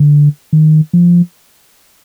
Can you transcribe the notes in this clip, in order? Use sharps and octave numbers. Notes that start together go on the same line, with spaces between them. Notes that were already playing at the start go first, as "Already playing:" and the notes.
Already playing: D3
D#3
F3